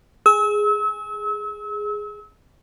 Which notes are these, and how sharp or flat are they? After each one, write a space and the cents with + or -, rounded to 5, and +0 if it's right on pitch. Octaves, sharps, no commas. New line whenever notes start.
G#4 +0 E6 -35